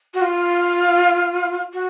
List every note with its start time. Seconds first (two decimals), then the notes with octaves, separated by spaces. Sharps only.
0.14 F#4
0.21 F4
1.73 F#4